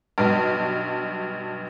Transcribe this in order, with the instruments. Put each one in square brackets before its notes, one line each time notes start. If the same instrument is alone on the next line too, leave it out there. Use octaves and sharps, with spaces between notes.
[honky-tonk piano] B1 G2